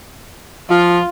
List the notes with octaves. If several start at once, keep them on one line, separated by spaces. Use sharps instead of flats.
F3 F4